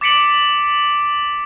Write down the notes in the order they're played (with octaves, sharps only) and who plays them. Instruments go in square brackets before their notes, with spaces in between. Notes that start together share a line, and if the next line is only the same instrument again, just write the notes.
[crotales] D6 A6 B6 C#7 D7 F#7